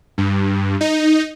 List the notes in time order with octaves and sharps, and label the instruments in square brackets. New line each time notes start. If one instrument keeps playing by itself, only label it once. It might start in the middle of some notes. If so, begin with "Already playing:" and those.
[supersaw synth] G2
D#4